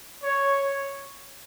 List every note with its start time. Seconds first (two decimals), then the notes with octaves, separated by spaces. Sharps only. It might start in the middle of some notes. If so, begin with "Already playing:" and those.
0.23 C#5